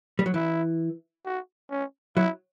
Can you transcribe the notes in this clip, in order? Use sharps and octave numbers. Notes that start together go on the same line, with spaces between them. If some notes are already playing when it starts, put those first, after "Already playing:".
G3
F#3
E3 E4
F#4
C#4
F#3 E4